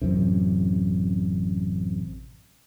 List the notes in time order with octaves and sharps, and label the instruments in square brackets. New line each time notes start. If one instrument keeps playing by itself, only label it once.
[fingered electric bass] A1 F#2 C3